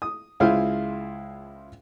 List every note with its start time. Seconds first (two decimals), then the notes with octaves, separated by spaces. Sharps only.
0.02 D#6
0.40 C#2 E4 F4 G#4 C5 F5